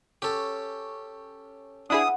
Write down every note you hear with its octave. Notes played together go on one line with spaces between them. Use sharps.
C#4 G4 A4
D4 E4 G#4 B4 F#5 D#6